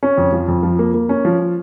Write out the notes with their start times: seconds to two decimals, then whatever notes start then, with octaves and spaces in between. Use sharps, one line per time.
0.03 C#4
0.18 F2
0.32 F3
0.48 F2
0.63 F3
0.79 A#3
0.94 A#3
1.09 C#4
1.25 F3